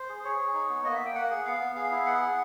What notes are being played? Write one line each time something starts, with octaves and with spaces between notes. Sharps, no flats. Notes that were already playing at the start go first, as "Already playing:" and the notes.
Already playing: C5
G#4
G#4 C#5
G#4
D#4
B3
A#3 D#5
E5
A#3
G5
A#3 F#5
G#4
B3 F5
B3
G#4 F5
E4
B3 F#5
G#4